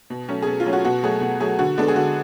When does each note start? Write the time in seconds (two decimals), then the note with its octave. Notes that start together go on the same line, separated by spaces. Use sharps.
0.10 B2
0.29 F#3 A3 C#4
0.42 G#4
0.47 B2 A4
0.60 F4
0.66 F#3 A3 C#4
0.73 F#4
0.85 B2 F#4
1.03 F#3 A3 G#4
1.21 B2
1.40 F#3 A3 G#4
1.59 D3 F#4
1.78 G#3 B3 D4 A4
1.88 G#4
1.96 D3 F#4